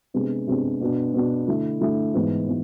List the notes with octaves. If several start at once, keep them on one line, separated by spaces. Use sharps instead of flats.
C3 G#3 B3 D4
C3 G#3 B3 D4
B2 B3 D4
B2 B3 D4
D3 A3 E4
D3 A3 E4
G#2 E3 B3
E3 B3